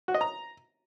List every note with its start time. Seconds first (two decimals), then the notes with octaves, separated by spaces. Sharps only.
0.08 F#4
0.14 D#5
0.21 A#5